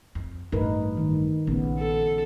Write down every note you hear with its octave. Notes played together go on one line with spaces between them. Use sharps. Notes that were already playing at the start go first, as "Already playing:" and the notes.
F2
A1 G2 D#4 A#4 B4
D#3
A#1 C#3 B3
A4